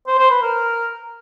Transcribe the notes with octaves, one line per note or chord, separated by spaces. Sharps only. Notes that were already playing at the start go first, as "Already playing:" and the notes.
C5
C5
B4
A#4